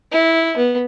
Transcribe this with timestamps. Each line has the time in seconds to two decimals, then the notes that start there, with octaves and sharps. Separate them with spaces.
0.12 E4
0.57 B3